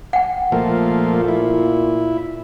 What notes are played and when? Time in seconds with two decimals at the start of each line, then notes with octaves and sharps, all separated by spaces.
0.13 F#5 G5
0.52 A#2 F3 A3 A#3
1.28 E4